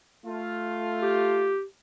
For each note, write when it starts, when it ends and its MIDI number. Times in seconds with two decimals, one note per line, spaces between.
0.25 1.55 57
0.25 1.55 65
1.02 1.63 67